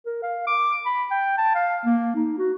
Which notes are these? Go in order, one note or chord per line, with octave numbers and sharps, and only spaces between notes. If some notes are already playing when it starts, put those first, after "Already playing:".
A#4
F5
D6
B5
G5
A5
F5
A#3
D#4
F#4